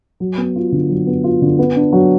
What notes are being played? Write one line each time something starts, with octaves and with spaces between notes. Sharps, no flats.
F#3
B3
F4
D3
F#3
B3
F4
D3
B3
D4
F#3